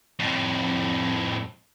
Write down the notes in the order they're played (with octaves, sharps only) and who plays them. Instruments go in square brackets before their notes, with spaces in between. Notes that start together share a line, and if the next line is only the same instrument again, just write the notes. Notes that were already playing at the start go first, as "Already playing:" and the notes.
[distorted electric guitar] F2 A2